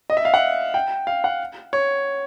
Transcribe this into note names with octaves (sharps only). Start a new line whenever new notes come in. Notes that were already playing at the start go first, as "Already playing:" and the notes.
D#5
E5
F5
F#5
G5
F5
F#5
C#5